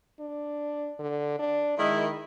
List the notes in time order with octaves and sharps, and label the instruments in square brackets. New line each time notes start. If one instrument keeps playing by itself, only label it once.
[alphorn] D4
D3
D4
[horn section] D#3 E4 [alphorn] G#3